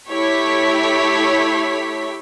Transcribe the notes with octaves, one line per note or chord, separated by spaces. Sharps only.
A3 E4 G4 C#5 B6